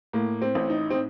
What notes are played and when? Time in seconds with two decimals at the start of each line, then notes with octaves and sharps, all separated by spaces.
0.13 A2 A#3
0.42 C4
0.55 A1
0.70 D#4
0.90 C4